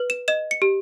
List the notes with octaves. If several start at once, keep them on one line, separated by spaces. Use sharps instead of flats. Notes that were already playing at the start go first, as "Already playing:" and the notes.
Already playing: B4
E7
D#5 E7
C#7
G4